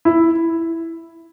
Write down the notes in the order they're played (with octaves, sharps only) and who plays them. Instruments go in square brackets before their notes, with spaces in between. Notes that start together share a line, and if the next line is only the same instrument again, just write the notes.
[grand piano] E4